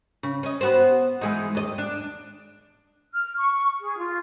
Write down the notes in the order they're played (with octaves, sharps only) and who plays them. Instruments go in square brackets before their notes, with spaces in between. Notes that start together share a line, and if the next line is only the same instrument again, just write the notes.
[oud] C#3
C#4 D#5
B3 F#4 C5
E3 G#3 D#4
D#2 D#5
D4
[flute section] F6
C#6
G#4
F4